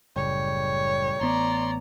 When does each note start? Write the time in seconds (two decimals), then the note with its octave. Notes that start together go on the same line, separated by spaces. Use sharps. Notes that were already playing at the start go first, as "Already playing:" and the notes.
0.16 F#1 A2 C#3 G3 C#5
1.21 A1 B3 D5 A#5 C6